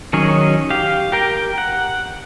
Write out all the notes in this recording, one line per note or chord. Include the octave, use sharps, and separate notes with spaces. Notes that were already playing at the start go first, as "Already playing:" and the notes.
D#3 F#3 C#4 G#4
G4 F5
G4 A#4 G5
F#5